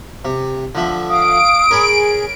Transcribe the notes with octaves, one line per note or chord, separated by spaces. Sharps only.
C3
D3 F3 E5
F5 D#6 D7
G#4 A#4 C#5 B5